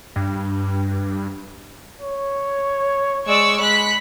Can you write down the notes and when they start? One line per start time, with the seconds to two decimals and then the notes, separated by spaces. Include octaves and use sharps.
0.16 G2
2.01 C#5
3.27 G#3 D5 C#6 E6
3.60 G#3 B5 F#6 B6